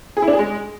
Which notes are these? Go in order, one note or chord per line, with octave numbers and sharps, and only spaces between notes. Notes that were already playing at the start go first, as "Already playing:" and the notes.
G#4
E4
D4
G#4
G#3